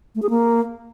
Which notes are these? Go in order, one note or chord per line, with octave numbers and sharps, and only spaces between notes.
A3
G#4
A#3